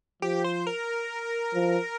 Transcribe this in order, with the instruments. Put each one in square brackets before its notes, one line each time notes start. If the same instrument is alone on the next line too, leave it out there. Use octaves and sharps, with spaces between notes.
[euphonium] F3 [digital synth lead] G4
[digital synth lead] C5
A#4
[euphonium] F3